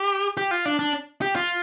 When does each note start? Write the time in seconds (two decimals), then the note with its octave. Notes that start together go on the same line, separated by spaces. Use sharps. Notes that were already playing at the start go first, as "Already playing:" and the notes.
Already playing: G4
0.37 G4
0.51 F4
0.65 D4
0.79 D4
1.22 G4
1.36 F4